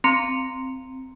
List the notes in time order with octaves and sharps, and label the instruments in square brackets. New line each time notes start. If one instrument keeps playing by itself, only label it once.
[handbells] C4 A#5 C6 C#7